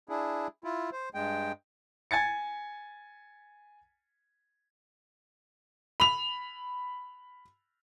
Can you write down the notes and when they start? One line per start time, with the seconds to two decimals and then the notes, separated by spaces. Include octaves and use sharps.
0.09 D4 E4 G#4
0.64 E4 F4
0.92 C5
1.15 G2 G#3 G5
2.11 G#5 G#6 A6 C#7
6.00 B5 F7